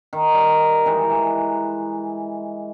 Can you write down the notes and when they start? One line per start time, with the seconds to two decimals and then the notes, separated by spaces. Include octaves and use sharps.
0.13 D#3
0.34 G3
0.86 E3 G#3 D#4
1.10 E3 A#5